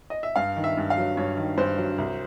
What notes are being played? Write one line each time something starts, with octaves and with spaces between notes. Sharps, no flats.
D#5
E5
G2 F5
D#3
E5
G2
F5
F#3
G2 C#5
D#3
G2 C5
F#3
C2